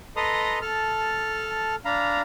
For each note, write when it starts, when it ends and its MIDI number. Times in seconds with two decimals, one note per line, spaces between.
0.16 0.59 69
0.16 0.59 71
0.16 0.59 75
0.16 0.59 82
0.16 0.59 84
0.16 0.59 87
0.62 1.75 69
0.62 1.75 81
0.62 1.75 89
1.85 2.22 62
1.85 2.22 77
1.85 2.22 82
1.85 2.22 83